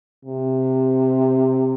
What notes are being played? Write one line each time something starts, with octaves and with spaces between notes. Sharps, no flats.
C3